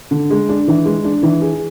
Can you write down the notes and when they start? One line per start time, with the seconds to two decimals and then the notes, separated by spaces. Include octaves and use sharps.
0.11 D3
0.31 G#3
0.49 D4
0.68 E3
0.85 G#3
1.05 D4
1.23 E3
1.41 G#4